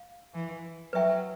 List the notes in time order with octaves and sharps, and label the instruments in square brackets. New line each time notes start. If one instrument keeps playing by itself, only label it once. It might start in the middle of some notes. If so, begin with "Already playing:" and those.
Already playing: [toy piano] F5
[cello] E3
[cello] F#3 [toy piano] B4 E5 G5